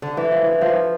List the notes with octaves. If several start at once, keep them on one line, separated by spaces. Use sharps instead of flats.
D3
E3
F3
E3
F3